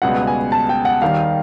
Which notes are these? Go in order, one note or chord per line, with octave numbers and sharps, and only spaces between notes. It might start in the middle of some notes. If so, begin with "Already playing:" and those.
C#2 B2 G3 B3 F#5
G#5
A5
G5
F#5
D#2 D#3 G3 F5